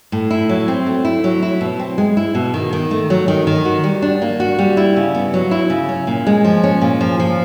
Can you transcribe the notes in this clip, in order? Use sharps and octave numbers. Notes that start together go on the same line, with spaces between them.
A2
E4
F#3
C4
A3
E4
F#3
E4
B2
C4
G#3
E4
B2
D#3
D#3
A3
F#3
D#3
D#3
F#4
G3
D4
A#3
F#4
G3
E4
C#3
B3
F#3
E4
C#3
C#4
A#2
G#3
F3
C#4
A#2
F3
F3